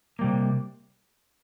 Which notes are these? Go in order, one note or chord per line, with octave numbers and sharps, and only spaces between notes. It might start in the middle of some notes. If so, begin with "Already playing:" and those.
C3 G3 A#3